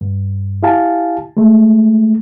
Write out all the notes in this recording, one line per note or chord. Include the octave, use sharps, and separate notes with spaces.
G2
E4 G4 F5 G#5 A5
G#3 A3